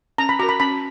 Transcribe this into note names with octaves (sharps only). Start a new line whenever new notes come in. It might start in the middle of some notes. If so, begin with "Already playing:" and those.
C#4 A#5
B5
F#4 A#4 A#5
B5
C#4 B5